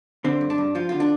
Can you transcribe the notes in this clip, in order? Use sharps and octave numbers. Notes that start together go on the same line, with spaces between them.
D3 C4
G2
D4
G2
F3 F4
D3 F4
D4